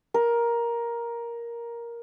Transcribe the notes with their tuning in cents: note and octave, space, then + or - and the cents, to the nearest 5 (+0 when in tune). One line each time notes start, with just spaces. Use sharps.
A#4 +10